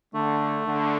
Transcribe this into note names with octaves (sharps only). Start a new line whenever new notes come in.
D3 A3
D3